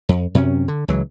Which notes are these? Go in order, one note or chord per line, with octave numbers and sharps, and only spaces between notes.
F2
F#2 C3 F#3 C#4
D3
C#2 C#3 E3 F#3